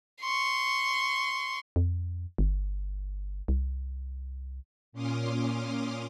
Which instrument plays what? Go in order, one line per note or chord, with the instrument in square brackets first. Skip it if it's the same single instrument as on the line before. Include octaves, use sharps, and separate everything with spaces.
[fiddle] C6 C#6
[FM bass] F2
G1
C2
[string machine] A#2 C#4 C6 D6 D#6 F6